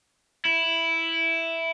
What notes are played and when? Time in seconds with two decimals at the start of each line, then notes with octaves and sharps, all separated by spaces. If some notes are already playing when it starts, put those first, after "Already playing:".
0.45 E4